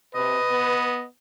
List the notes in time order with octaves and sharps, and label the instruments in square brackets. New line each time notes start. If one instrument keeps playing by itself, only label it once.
[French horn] C3 [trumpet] B4 [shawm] D#5
[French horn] B3